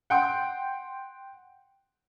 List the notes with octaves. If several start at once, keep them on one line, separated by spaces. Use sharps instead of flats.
F#5 G5 C6